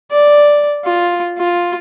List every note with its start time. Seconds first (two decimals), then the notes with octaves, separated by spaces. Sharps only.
0.12 D5
0.85 F4
1.39 F4